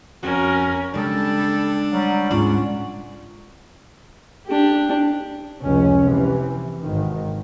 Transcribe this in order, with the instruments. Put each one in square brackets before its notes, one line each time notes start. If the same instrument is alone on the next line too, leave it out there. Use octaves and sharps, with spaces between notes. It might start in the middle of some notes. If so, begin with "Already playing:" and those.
[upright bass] F2 [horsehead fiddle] C#4 A#4 [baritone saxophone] F#4
[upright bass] C#3 G#3 [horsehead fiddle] G3 A4 [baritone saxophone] D4
[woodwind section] F#3 G3 [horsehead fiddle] F#5
[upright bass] D1 G#2 [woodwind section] C#4 F4 [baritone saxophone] D4
[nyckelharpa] D4 G4
[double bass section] F1 C#2 C#4
C3 E3
G#1 D#3